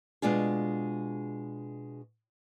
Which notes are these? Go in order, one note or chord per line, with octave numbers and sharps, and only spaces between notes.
B2 G#3 D4 F4 G#4